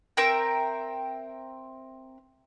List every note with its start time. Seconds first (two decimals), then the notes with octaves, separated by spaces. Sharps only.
0.17 C4 A#4 E5 G5